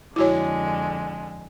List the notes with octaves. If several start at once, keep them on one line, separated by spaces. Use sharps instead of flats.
F2 D3 G#3 E4 F#4 C#5